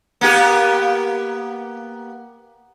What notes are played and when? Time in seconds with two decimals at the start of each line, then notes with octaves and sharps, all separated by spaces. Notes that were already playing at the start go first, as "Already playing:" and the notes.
0.21 A#3 B3 G4